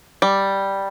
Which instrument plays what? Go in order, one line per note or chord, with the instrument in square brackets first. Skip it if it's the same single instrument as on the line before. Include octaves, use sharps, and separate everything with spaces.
[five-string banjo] G3